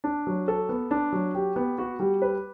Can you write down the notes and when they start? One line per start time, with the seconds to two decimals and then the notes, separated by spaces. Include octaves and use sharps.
0.04 D4
0.27 F#3
0.48 A4
0.69 B3
0.91 D4
1.12 F#3
1.35 G4
1.56 B3
1.78 F#4
2.00 G3
2.22 B4